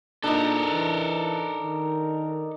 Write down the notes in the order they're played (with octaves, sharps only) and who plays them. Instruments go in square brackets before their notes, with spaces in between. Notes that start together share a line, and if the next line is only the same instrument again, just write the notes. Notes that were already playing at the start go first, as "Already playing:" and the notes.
[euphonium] A#2 [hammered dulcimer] D4 D#4 [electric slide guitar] A4 A#4
[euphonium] E3
D#3